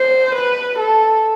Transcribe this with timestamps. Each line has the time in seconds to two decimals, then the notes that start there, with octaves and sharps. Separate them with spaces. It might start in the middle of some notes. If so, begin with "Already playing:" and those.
Already playing: C5
0.35 B4
0.79 A4